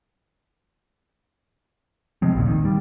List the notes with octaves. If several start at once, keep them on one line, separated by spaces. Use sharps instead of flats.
C3 F3 G#3 C4
A#1 D#2 A#2
D#3
G3